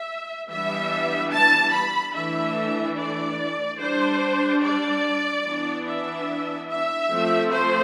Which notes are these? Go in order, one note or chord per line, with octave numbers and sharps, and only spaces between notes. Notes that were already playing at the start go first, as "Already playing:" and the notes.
Already playing: E5
E3 G3 B3 D4 E5
A5
B5
E3 A3 D4 E5
D5
G3 D4 C5
D5
E3 B3 D4
E5
E5
F3 A3 C4
C5